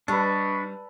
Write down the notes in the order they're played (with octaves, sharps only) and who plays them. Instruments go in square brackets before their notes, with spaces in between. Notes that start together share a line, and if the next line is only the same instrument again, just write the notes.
[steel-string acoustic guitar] G3 [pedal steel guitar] D4 [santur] A4 B4 [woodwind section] D#5 B5 C#6